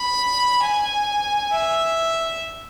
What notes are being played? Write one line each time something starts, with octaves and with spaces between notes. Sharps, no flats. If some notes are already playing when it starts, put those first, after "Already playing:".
Already playing: B5
G#5
E5